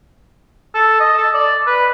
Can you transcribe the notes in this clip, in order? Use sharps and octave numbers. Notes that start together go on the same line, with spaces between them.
A4
D#5
A4
D5
B4